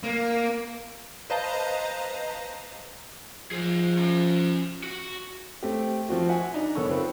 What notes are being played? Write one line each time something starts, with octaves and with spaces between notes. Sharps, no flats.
A#3
B4 C5 D#5 F5 A5 A#5
F3 G#4 C5
C#4 A#5
F#4
A3 C4 G4
F3 C4 F#4
E5 F#5 G#5
D4 D#4
F#1 D#3 B3 A4 C#5 C#6
C4 F4 A4 B4